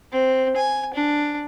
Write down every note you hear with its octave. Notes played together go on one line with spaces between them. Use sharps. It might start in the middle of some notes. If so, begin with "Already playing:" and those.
C4
G#5
D4